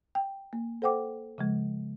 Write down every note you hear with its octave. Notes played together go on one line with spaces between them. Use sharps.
G5
A#3
A4 C5 F#5 G5 D6
C#3 F3 G#3